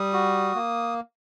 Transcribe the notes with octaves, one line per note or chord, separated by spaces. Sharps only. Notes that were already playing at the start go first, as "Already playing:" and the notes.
Already playing: G3 D#6
F#4
A#3